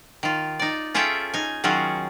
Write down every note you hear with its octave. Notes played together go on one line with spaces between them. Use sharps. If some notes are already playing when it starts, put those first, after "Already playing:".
D#3 F4
D#4 D5
C#4 F4 G#4 A4 E5 G5
D#4 G#5
D#3 F#3 C#4 F4 F#4 G#4